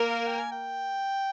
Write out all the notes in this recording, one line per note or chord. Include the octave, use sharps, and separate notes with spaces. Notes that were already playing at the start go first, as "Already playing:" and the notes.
Already playing: A#3 A#4
F5
G5
G#5
G5